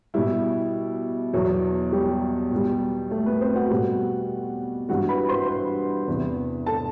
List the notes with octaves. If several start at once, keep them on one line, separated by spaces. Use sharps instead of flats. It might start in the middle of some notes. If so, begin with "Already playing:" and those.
B2 G3 E4
E2 B2 F#3
G3 G4
B2 G3
A3 A4
B3 B4
C4 C5
F#4 F#5
B2 G3
G2 E3 G3 F#4 F#5
B4 B5
C5 C6
B4 B5
E2 C3 E3
A4 A5